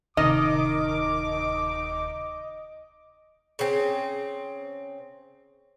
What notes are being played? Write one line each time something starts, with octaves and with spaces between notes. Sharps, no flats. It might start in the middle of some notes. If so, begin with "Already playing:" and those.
D1 C3 D#3 D#5 D6
C#3 C4